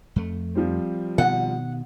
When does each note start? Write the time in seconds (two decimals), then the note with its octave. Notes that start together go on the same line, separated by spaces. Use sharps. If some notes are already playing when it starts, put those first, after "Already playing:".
0.16 F2 A3
0.55 F3 G3 C4
1.18 B2 D#3 F#5